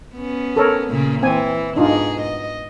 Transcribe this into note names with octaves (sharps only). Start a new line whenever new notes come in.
B3 C#4
A4 A#4 C#5
A#2 C#3 A#3
E3 C4 G#5
G#2 B2 D4 D#4 F4 G#4
D#5